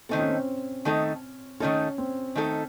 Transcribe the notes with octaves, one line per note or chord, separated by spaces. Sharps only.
D#3 A3 C4 D#4 A4
C#4
C4
D#3 A3 D#4 A4
D#3 A3 C#4 D#4 A4
C4
D#3 A3 D#4 A4